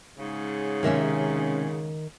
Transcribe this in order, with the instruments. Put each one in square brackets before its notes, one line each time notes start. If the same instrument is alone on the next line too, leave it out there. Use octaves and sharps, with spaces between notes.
[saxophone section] G#2 C#3
[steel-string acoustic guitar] C3 G#3 C#4 [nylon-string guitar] D#3 A#4 E5